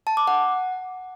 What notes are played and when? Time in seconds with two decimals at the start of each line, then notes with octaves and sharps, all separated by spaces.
0.07 A5
0.17 D6
0.27 F#5